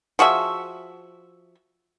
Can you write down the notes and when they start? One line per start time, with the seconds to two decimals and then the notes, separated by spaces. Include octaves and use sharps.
0.19 F3 F#4 G#4 E5